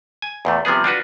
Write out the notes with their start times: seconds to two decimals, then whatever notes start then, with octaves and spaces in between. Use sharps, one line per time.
0.22 G#5
0.45 E2 A#2 A3
0.65 C3 F3 G3 B3 G#4
0.84 D4 F4 F#4 B4